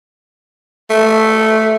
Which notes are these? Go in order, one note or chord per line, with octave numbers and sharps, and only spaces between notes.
A3